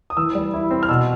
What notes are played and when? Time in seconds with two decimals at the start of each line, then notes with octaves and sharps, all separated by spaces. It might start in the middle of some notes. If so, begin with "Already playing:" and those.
0.10 D#6
0.17 E3 E6
0.35 G3
0.54 E4
0.71 C4
0.83 F6
0.89 B2 E6